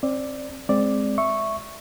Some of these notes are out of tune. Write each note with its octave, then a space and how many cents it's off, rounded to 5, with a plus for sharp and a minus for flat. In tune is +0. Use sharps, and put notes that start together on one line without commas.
C4 +25 D5 +0
G#3 +0 C4 +0 D5 +0
E5 +0 C#6 -5